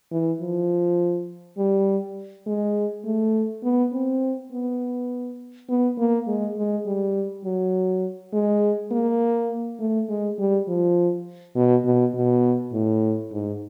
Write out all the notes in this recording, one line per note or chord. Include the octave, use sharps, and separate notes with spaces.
E3
F3
G3
G#3
A3
B3
C4
B3
B3
A#3
G#3
G#3
G3
F#3
G#3
A#3
A3
G#3
G3
F3
B2
B2
B2
A2
G#2